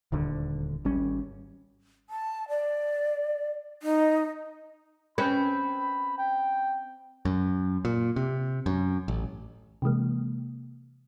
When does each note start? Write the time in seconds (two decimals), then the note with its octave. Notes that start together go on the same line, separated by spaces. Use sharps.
0.12 D#1 D2 D3
0.85 G#1 G3 C#4
2.10 A5
2.49 D5
3.83 D#4
5.18 C4 C#4 B4 B5
6.18 G5
7.25 F#2
7.85 A#2
8.16 C3
8.66 F#2
9.08 A1
9.82 C3 E3 G#3 A#3